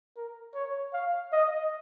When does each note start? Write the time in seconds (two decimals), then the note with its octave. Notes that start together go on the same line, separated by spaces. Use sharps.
0.17 A#4
0.55 C#5
0.93 F5
1.32 D#5